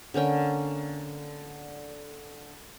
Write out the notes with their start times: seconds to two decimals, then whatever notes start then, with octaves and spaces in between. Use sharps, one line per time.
0.14 D3 A#3 C#4 G5